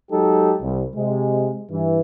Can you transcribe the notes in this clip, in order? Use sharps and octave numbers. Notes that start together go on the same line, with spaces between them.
F#3 G#3 D#4 G4 A4
C2
C3 G#3
G2 E3